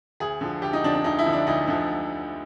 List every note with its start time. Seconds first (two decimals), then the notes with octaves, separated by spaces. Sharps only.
0.20 D2 G#4
0.41 D3 F3
0.62 D2 G4
0.73 D#4
0.84 D3 F3 D4
0.94 D4
1.04 D2 D#4
1.19 E4
1.26 D3 F3
1.33 D4
1.47 D2 D#4
1.68 D3 F3